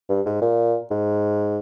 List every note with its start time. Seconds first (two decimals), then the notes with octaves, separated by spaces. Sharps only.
0.09 G2
0.26 G#2
0.42 A#2
0.91 G#2